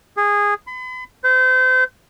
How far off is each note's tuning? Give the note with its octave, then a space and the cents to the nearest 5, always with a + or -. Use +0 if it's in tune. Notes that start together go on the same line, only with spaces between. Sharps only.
G#4 -15
B5 +40
C5 -35